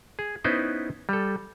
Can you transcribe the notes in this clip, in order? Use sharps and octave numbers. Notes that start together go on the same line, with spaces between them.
G#4
B3 C#4 D#4 E4 B4 C5
G3 A4